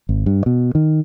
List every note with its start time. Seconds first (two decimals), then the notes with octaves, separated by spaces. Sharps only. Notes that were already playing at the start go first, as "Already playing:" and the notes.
0.09 G#1
0.26 G2
0.46 B2
0.75 D#3